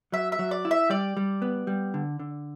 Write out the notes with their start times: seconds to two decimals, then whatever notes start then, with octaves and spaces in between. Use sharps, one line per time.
0.12 F#3 E5
0.32 E5
0.39 F#3
0.51 D5
0.65 E4
0.71 E5
0.90 G3 D5
1.17 G3
1.42 B3
1.67 G3
1.94 D3
2.19 D3